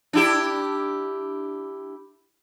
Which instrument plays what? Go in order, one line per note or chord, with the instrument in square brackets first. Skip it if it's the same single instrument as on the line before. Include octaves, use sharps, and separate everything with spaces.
[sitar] D4 E4 G4